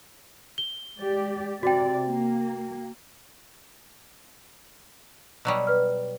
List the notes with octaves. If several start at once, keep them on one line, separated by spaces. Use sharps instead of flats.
G7
G#3 G4 D5
C3 F#4 D5 G5
A#3
B2 F#3 G3
B4 F6